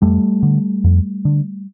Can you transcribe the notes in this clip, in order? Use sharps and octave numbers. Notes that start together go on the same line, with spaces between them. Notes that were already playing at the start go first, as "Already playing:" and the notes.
F2 G3 A3
D3
F2
D3